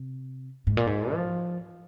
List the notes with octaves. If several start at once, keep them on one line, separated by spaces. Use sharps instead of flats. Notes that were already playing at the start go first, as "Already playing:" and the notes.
Already playing: C3
G#2
A#2
G#2
F3